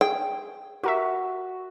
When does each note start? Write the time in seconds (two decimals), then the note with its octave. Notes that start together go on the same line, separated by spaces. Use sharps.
0.01 G#4 G5
0.83 F#4 G4 A#4 E5